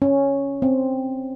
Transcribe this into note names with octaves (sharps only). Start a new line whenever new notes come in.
C#4
C4